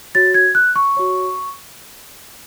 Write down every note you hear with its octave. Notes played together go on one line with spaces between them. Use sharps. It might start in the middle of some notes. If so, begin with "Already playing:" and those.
F#4 C#5 A6
G#6
F#6
C#6
F#4 C#5